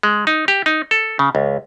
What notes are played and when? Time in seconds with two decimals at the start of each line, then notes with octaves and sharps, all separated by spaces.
0.03 G#3
0.27 D#4
0.48 G4
0.66 D#4
0.91 A4
1.19 C#3
1.35 C#2